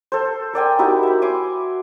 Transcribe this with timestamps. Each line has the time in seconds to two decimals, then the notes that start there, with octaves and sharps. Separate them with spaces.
0.12 A4 C5
0.53 A#4 D5 G5 G#5
0.79 D#4 E4 F#4 G4
1.03 E5 B5
1.22 G#5 C6 D6